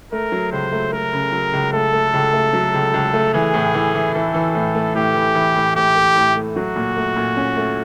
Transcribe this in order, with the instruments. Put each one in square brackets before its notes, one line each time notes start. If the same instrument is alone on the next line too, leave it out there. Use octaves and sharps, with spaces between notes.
[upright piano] A3 [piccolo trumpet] A#4
[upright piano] F#3
[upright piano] C#2 [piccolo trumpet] C5
[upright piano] A3
[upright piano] A3 [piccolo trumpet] A#4
[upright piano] C#3
F#3
C#2
[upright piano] A3 [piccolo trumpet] A4
[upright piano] A3
C#2
A3
F#3
C#2
C#2
A3
[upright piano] E3 [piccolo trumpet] G#4
[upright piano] A2
E3
E3
[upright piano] E3 [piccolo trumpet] A4
[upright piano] E3
A2
A3
[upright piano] A2 [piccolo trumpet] G4
[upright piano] E3
E3
A2
[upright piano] A2 [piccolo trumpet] G4
[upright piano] A3
A2
A3
[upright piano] F#3 [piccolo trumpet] F#4
[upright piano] A#2
A3
A#2
C#4
A3